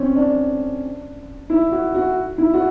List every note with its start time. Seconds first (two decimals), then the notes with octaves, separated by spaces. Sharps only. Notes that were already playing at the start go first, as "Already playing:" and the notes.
Already playing: C4 C#4
0.16 D4
1.50 E4
1.72 F#4
1.95 F#4
2.38 E4
2.54 F#4